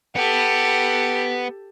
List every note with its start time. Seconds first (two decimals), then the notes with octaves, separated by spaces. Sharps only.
0.16 B3 G4 A4